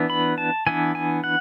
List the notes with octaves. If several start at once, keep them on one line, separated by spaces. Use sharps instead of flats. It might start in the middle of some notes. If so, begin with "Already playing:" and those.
Already playing: E3 B3 D4
B5
A5
E3 B3 D4 G#5
G#5
F#5